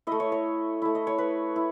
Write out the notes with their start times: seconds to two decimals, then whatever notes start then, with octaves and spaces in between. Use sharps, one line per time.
0.07 A3 E4 D#5
0.20 C#5
0.32 C#5
0.82 A3 E4
0.95 D#5
1.07 C#5
1.18 B4
1.56 E4